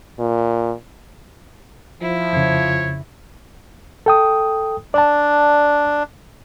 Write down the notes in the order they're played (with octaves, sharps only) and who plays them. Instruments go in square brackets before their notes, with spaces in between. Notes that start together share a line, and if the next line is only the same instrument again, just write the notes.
[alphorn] A#2
[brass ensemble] F3 [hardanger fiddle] E4
[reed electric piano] F2 C#3 [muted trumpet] C#5
[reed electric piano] A4 G5 D#6
[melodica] D4 [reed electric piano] D5 A5